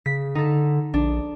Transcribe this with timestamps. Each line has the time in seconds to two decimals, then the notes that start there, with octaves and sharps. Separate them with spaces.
0.06 C#3 B6
0.35 D3 D#4 A4
0.94 A#1 D4